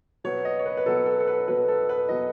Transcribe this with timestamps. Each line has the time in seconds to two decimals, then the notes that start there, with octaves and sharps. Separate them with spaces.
0.24 B2 F#3 B3 C#5
0.45 D#5
0.59 C#5
0.66 B4
0.77 B4
0.86 B2 F#3 B3 A4
1.06 A4
1.20 A4
1.28 B4
1.48 B2 F#3 B3 B4
1.68 A4
1.89 B4
2.09 B2 F#3 B3 D#5